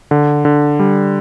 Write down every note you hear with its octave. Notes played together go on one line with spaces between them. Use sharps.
D3
D3
G3